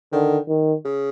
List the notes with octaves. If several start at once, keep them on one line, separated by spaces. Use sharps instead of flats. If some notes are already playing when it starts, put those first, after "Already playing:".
D3 D#3
D#3
C#3